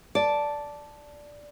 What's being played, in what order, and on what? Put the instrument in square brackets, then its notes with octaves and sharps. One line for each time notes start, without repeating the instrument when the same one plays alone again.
[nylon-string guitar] D5 [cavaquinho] A5